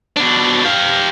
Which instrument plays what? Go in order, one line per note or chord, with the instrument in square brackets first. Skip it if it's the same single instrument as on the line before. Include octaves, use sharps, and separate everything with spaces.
[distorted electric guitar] B2 D4
G4 F5